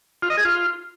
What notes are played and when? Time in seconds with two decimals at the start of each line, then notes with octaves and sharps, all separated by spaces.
0.22 F4
0.30 D#5
0.37 G#4
0.45 F4